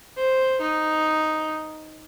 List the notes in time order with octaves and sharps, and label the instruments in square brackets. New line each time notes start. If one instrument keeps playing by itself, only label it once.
[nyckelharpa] C5
D#4